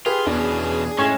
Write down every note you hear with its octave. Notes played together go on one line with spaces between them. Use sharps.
F4 G4 G#4 B4
E2 B2 C#4 D4
A2 G#3 C#4 G#6 E7